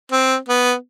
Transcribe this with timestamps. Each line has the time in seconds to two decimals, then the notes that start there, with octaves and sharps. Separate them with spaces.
0.11 C4
0.48 B3